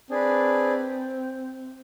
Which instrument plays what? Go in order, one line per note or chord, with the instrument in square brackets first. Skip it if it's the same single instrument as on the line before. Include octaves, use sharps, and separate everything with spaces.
[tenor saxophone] C4 [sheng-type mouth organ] D4 G#4 B4